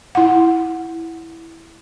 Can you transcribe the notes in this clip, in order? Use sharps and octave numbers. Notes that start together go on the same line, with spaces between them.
E4 F#5